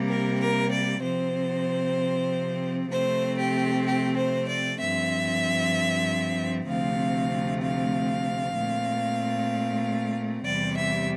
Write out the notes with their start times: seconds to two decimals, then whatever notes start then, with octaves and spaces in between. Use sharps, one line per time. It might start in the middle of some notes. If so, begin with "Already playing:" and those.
Already playing: C3 G3 A#3
0.08 A#4
0.40 A#4
0.71 D5
1.02 C3 F3 C4 C5
2.91 C3 F3 A3 C4 C5
3.38 G4
3.85 G4
4.16 C5
4.48 D5
4.79 G2 F3 C4 E5
6.68 D2 C3 F3 A3 C4 F5
7.62 F5
8.56 A#2 A3 C4
10.45 E2 C3 G3 D5
10.77 E5